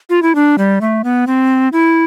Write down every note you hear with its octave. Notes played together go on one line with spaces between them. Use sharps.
F4
E4
D4
G3
A3
B3
C4
E4